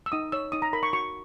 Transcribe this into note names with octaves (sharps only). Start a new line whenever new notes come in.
E6
D#4 D#6
C#5 E6
D#4 D#6
A#5
A#4 B5
C#6
F#4 C#6